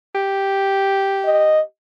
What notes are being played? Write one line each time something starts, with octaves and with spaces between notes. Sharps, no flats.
G4
D#5